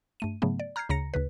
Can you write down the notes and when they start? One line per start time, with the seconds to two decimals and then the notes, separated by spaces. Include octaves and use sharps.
0.20 G2 A3 D#7
0.42 G#2 C#3 F#3 A3 B3
0.60 D5
0.76 A#5 F6 G6 G#6 C7
0.89 D2 C#3 A#5 A#6 C#7
1.14 D2 C#3 B4